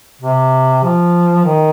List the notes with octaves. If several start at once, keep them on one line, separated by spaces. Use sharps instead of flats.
C3
F3
D#3